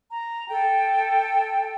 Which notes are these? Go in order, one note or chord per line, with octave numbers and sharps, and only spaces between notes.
A#5
A4 G5